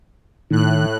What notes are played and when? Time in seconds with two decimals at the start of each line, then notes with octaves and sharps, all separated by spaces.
0.51 A2 D#3 F#6